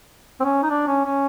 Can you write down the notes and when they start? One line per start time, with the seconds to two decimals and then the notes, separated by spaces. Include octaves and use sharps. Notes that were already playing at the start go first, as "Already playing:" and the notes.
0.40 C4
0.44 C#4
0.63 D#4
0.70 D4
0.87 C#4
1.05 C#4